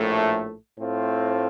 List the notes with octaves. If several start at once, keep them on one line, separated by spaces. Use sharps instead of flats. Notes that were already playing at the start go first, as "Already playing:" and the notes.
Already playing: A#1 A2 A3
A2 A3 C4 F4